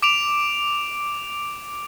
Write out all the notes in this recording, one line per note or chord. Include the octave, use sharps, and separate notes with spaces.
D6 D7 F7